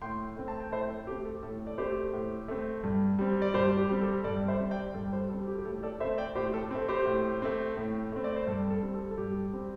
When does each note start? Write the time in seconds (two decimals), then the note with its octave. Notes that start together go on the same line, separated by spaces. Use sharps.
0.02 A2 G5 C6
0.36 A3 C4
0.48 A5
0.60 G5
0.72 A2 C5 E5
0.90 A4
1.07 A3 C4 G4
1.25 A4
1.43 A2 A4
1.67 D5
1.78 A3 C4 G4 C5
2.13 A2
2.48 A3 C4
2.83 G2
3.19 G3 C4
3.42 D5
3.54 G2 G4 C5
3.77 G4
3.89 G3 C4
4.01 A4
4.24 G2 A4 D5
4.48 C5 E5
4.59 G3 C4
4.71 D5 G5
4.94 G2 A4
5.13 G4 C5
5.30 G3 C4 A4
5.47 G4
5.58 G4
5.65 A2 A4
5.83 A4 D5
6.00 A3 C4 C5 E5
6.18 D5 G5
6.35 A2 G4 C5
6.54 A4
6.71 A3 C4
6.88 G4 C5
7.06 A2
7.42 A3 C4
7.77 A2
8.12 A3 C4
8.24 D5
8.36 C5
8.47 G2 A4
8.70 A4
8.82 G3 C4
8.94 A4
9.11 A4
9.18 G2 G4
9.53 G3 C4